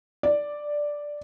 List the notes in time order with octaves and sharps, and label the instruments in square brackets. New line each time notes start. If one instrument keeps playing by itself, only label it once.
[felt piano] D5